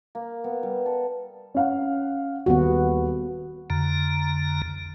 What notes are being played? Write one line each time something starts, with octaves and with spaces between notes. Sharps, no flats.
A#3
B3
G3
A4
C#4 F5 F#5
D#1 B3 F#4
F2 D3 A#5